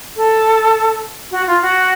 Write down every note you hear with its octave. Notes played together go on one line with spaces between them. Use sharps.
A4
F#4
F4
F#4